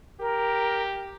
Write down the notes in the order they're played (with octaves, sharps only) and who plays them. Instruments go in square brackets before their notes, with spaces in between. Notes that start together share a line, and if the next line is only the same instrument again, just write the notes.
[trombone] G4 [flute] A#4